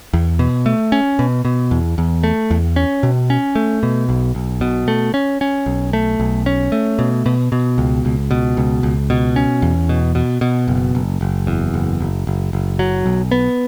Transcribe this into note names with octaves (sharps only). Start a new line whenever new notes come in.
E2
B2
A3
C#4
B2
B2
E2
E2
A3
E2
C#4
B2
C#4
A3
B2
B1
B1
B2
A3
C#4
C#4
B1
A3
B1
C#4
A3
B2
B2
B2
C#2
C#2
B2
C#2
C#2
B2
C#4
E2
B2
B2
B2
F#1
F#1
F#1
E2
F#1
F#1
F#1
F#1
F#3
B1
B3